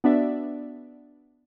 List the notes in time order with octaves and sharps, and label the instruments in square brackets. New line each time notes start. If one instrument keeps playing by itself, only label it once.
[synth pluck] B3 D4 F#4 D5 E5